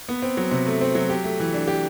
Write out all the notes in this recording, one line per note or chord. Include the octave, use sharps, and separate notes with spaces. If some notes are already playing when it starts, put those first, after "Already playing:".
B3
C4
F#3
C3
A3
C4
F#3
G4
A3
E3
D4
G4